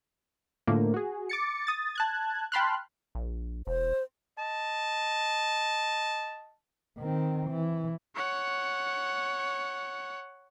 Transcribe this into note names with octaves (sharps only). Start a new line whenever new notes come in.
A2 D3 F3 A3 A#3
F#4 G#4
D6 A6 C#7
D#6 A6
A5 F#6 G#6
G5 A5 B5 C6 F6 F#6
A#1
E1 C5
D#5 A5
D#3 C4
E3
C#5 F#5